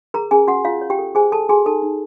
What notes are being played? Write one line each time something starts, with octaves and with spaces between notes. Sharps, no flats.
G#4 A#4 A#5
C#4 G#4 G#5
C#4 F#4 F#5
F4 C#5 F5
C#5
G4 G5
A4
G#4 C5 G#5
A4 A5
F#4 G#4 G#5
D#4 A4 A5
D#4